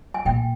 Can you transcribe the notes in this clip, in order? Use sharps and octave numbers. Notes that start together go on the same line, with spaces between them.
G#5
A#2 G5